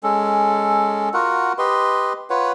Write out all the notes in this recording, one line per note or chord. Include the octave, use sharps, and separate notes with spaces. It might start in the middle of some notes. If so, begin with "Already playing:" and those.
G#3 C#4 A4
F4 F#4 A#4 F#5
G4 B4 D#5 C6
F4 B4 C#5 F#5